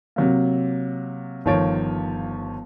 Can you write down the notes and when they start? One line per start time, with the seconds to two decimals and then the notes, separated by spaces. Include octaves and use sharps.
0.16 C3 F#3 A#3
1.45 G1 D#3 F3 C#5 A6 D7